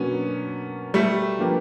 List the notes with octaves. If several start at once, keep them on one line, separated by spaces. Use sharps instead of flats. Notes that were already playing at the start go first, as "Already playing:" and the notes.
Already playing: B2 F#3 A#3 B3 C#4 D4
G3 A3
F3 A#3 D4 G4 B4